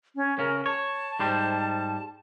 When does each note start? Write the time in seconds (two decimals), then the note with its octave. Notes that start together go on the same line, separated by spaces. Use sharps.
0.16 C#4
0.39 C#3 C#4 A#4
0.66 C#5 A5
1.19 G#2 G3 C5